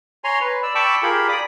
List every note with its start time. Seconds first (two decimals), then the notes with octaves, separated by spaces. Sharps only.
0.24 C#5 G#5 A#5 C6
0.41 B4
0.63 D5 E6
0.75 G5 A5 B5 C#6 D6 E6
1.03 F4 G4 G#4 A#4 B5
1.29 D5 B5 D6 D#6